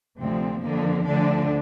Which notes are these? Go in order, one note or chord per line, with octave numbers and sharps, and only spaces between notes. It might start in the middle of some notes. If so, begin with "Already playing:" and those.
D2 C3 F3 C4
F2 D3 F3 A#3
D2 D3 F3 D4